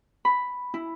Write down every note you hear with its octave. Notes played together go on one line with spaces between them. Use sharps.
B5
E4